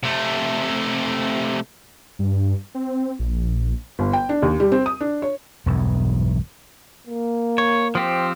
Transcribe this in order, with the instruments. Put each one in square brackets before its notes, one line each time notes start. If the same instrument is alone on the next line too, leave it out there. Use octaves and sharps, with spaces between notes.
[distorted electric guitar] C3 A3
[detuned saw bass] G2
C4
A#1
[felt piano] G1
G5
D4
D#2
G3
C4
D#6
D4
C#5
[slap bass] E1 B1 E2 G2
[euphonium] A#3
[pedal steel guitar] C#5
F3 C4 G4